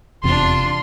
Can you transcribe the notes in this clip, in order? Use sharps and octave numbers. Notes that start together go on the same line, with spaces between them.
F1 E2 C3 D4 F4 C6